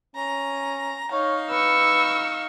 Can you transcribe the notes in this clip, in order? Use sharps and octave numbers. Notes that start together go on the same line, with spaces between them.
C#4 A#5
D#4 C#5 F5
B4 C#6 E6